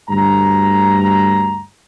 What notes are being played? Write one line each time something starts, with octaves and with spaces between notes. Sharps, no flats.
D2 G2 A#5